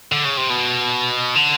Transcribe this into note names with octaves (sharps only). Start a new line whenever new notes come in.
D3
C#3
C3
B2
D3